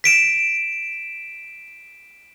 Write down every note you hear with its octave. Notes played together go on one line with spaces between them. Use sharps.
B6 D7 E7